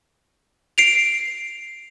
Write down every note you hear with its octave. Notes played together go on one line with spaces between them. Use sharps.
C7 D7 F7